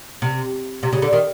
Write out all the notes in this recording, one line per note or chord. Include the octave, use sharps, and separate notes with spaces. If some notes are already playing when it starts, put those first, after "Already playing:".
C3
C3
C#3
D3
D#3